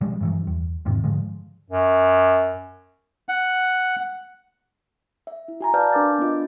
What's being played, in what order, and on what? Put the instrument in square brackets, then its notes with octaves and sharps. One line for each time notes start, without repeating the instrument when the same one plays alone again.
[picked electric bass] B2 F3 G3 G#3
G2 E3 F#3
E2
E2 G#2 C3 D#3
G#2 D3 F3 G#3
[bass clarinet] F#2
[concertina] F#5
[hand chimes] E5
E4
F#4 G#5 A#5
B4 D5 F5 A5 F6 G6
D4 A#4 D6 G6 A6
B3 D4 F4 D#5